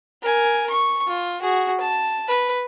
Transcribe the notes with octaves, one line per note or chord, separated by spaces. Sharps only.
A#4 G#5
C#6
F4
F#4 G#4
A5
B4